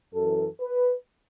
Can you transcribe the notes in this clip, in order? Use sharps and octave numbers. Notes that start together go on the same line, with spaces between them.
F#2 E3 A4
B4